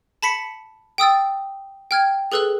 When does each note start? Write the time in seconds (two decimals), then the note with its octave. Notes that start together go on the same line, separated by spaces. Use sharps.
0.23 A5 B5 B6 C#7
0.98 G5 D#6 E6 A6
1.91 G5 F6 G#6
2.32 G#4 A4 B4 E6 F#6